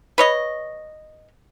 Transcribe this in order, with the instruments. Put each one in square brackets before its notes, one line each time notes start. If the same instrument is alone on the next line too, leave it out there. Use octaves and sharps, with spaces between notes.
[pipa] B4 C#5 D#5